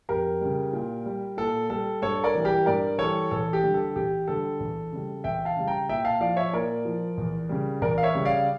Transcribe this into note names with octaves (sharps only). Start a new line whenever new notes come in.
F2 G4 A#4
C#3 G3
A#2
G3
A#2 A4
G3 A4
G2 A4 C#5
A#4 D5
E3 G3
G4 A#4
G2 A#4 D5
E3 G3 A4 C#5
E2 A4
G4
D3 G3
A4
E2 G4
D3 G3 A4
E2
C#3 G3
E2 E5 G5
F5 A5
C#3 G3
G5 A#5
A#2 E5 G5
F5 A5
F3 D5 F5
C#5 E5
A#2 A#4 D5
F3
E2
C#3 G3
E2 A#4 D5
F5
C#5 E5
C#3 G3
D5 F5